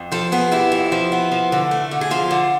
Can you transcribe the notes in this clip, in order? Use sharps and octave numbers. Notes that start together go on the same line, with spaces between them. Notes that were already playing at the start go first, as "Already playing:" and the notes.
Already playing: F2
F3 A4
B3 G#4
C3 E4
F2
F3
B3
F3
D3
A3
D3
G#4
F3 F4
D3